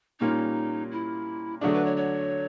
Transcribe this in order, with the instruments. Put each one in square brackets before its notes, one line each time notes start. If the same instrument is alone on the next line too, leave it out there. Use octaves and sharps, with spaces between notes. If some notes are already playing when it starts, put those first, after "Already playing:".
[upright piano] A#2 G3 A#3 C#4 F4 [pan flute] D#4
[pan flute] E4
[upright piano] D3 F#3 A3 D4 [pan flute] G#4
[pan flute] B4
C#5
C#5